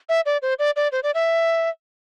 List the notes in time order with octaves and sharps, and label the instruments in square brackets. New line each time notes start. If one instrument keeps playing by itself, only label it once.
[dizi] E5
D5
C5
D5
D5
C5
D5
E5